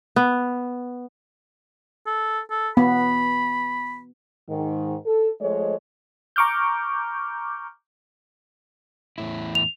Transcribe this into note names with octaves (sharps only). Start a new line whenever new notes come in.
B3
A4
A4
B3 B5
G#2 D#3
A4
F3 G#3 A3 C5 C#5 D#5
A#5 C#6 D6 F6 G6
E2 A2 E4
F7